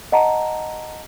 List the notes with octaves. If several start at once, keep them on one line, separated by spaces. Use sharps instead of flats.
D#5 F#5 A5 A#5